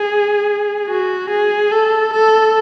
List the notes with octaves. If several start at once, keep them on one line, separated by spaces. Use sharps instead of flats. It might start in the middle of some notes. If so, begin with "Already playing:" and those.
Already playing: G#4
F#4
G#4
A4
A4